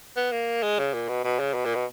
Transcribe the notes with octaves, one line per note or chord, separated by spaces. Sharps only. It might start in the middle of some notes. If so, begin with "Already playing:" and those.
B3
A#3
G#3
C#3
A#2
B2
B2
C#3
B2
A#2
B2